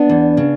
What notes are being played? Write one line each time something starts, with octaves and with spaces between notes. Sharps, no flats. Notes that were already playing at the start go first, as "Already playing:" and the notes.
Already playing: B3 D4
E2
C#3